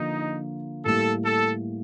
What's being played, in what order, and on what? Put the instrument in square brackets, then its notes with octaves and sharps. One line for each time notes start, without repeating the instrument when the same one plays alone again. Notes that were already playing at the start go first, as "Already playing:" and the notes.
Already playing: [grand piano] D3 F3 A#3 F4 [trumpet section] D#4
[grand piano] A2 G3 A#3 [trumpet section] A4
[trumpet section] A4